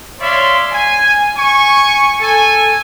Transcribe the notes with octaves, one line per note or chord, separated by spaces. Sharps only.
C#5 D5 E5 F5 C6
G#5
G#5 C#6
A4 G#5